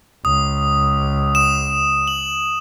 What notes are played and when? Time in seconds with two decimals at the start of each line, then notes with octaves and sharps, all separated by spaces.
0.25 C#2 D#6
1.35 D#6 E7
2.07 F#7